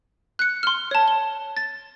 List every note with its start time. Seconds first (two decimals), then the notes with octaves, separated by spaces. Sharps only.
0.39 F#6 C#7
0.63 C6 F6
0.91 C#5 A5
1.08 G7
1.57 A6